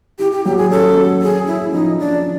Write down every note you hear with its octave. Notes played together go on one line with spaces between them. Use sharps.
E4 G4
G4
F#3 G4
G#4
C#4 A4
F#3
C#4 G#4
C#4 E4
F3 D#4
F3 D4